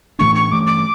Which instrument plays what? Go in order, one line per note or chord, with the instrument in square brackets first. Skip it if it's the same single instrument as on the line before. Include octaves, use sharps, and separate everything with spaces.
[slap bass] A2 E3 A3 D4 [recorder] C#6
[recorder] C#6
[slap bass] G2 E3 A3 [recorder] D6
[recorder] D6